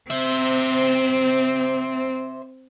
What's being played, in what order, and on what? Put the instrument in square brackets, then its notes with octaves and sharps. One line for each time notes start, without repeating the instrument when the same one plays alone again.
[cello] C4 [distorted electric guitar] C5 E5